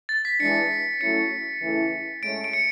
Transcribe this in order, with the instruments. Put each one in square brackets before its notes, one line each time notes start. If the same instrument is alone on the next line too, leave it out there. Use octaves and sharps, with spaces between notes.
[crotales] A6
B6
[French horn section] E3 G#3 D4 [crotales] C#7
[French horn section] F#3 A3 C#4 E4 [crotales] C#7
[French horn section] C#3 E3 A3 C#4 E4
[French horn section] A2 G#3 C#4 [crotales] D7
[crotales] D7
C#7